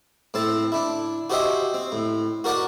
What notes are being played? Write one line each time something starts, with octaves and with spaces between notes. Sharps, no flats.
A2 C4 A4 A5
D4 E4
F#4 G4 C5 D#5 E5 G#5
C4
A2
F#4 A#4 D5 F#5 G#5